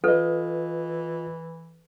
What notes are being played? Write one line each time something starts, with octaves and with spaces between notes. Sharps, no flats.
E3 F4 A4 B4 D#5